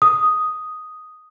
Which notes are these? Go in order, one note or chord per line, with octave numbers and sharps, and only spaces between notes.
D#6